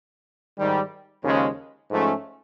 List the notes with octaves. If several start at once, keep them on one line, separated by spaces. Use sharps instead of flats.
G#2 D#3 G3
D#2 C#3 F3 G#3 C#4
G#2 F3 A3 C#4